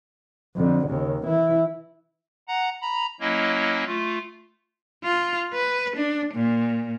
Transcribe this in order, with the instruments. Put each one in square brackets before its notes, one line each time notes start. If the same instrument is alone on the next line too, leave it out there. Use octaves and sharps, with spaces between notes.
[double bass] F2 D3
D#2 C#3
E3 E4
[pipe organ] F#5 A#5
A#5 B5
F#3 A#3 C#4 E4 D#5
A3 F4
[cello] F4
B4
D4
A#2